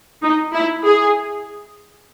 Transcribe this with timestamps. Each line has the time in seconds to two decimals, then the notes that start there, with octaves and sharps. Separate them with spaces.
0.22 D#4
0.54 E4
0.85 G#4